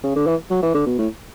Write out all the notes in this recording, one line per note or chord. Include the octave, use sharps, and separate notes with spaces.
C#3
D3
E3
F#3
E3
D3
B2
A2